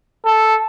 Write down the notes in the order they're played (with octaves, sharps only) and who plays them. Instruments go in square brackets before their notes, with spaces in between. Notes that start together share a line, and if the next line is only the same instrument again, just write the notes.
[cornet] A4